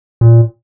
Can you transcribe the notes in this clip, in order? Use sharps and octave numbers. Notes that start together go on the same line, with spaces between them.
A#2